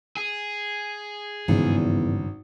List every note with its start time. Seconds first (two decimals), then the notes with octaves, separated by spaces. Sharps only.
0.17 G#4
1.48 G#1 E2 G2 C#3